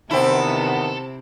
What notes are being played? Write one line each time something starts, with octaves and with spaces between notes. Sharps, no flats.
E2 C3 D#3 B3 C4 E4 A4